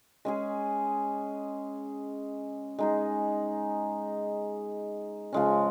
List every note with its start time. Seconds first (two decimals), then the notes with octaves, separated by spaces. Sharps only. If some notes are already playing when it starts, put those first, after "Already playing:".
0.25 G#3 C#4 G#4
2.79 G#3 D#4 G#4
5.33 C#3 F3 G#3 C#4